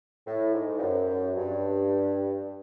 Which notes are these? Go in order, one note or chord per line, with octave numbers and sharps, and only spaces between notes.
A2
G#2
G2
F#2
G2